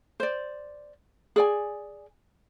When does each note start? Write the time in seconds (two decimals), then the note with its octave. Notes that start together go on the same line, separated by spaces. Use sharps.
0.20 C5 D5
1.36 G#4 D5 G#5